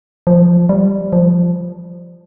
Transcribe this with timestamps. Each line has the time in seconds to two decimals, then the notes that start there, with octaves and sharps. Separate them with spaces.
0.27 F3
0.69 G3
1.13 F3